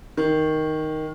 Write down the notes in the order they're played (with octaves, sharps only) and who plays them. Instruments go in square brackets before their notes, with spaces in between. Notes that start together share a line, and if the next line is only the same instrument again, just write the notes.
[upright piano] D#3